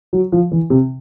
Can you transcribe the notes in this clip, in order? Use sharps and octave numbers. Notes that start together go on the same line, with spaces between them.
F#3
F3
E3
C3